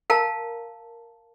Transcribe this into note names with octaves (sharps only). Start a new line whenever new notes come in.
A#4 F5 A5 A#5